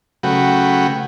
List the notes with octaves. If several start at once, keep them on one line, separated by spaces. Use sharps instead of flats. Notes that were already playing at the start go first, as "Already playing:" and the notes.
C#3 F#3 A3 F#4 B4 G5